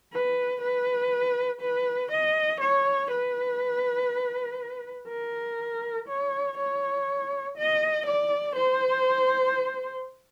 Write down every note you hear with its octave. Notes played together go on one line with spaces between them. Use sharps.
B4
B4
B4
D#5
C#5
B4
A#4
C#5
C#5
D#5
D5
C5